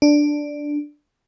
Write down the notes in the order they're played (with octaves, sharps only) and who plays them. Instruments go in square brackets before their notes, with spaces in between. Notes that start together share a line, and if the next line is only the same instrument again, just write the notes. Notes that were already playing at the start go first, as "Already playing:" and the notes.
[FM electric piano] D4